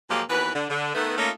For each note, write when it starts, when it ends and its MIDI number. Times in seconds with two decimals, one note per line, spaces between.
0.10 0.22 46
0.10 0.22 53
0.10 0.22 54
0.10 0.22 56
0.10 0.22 58
0.10 0.22 67
0.29 0.51 39
0.29 0.51 52
0.29 0.51 59
0.29 0.51 66
0.29 0.51 71
0.55 0.69 50
0.70 0.92 50
0.95 1.16 51
0.95 1.16 57
0.95 1.16 59
1.18 1.31 57
1.18 1.31 58
1.18 1.31 61
1.18 1.31 63
1.18 1.31 65